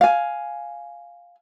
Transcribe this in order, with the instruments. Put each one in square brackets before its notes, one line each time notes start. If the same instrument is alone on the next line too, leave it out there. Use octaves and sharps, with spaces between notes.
[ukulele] F5 G#5